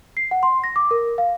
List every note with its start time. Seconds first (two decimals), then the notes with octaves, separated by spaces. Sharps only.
0.17 C7
0.31 F#5
0.43 C6
0.64 A#6
0.76 D6
0.91 A#4
1.18 F5